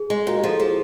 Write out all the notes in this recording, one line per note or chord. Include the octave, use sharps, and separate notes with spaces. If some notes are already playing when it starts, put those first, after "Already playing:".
Already playing: G#4
G#3
A#2 F#4
G4
F3
A4
F3 G#4